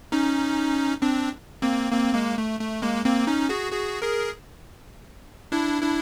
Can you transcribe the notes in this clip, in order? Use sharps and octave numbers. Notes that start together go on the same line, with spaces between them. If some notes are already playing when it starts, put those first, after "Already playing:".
C#4 D#4
C4 D4
A#3 C4
A#3 C4
G#3 A#3
A3
A3
G#3 A#3
A#3 C4
C#4 D#4
F#4 G#4
F#4 G#4
G#4 A#4
D4 E4
D4 E4